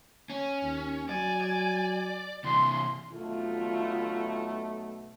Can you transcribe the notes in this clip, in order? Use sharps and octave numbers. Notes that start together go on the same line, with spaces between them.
C#4
D#2
F#3 D5 G#5
D5
C3 E3 C6
B1 B2 A3 F4